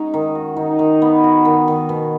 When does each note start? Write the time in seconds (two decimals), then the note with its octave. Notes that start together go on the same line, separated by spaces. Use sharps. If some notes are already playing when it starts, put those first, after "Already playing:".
Already playing: G#3 C#4 D#4 F#4
0.14 D#3
0.35 F#4
0.57 D#3 D#4
0.79 D#3
1.02 B3
1.24 F#4
1.45 D#3
1.68 D#3
1.89 B2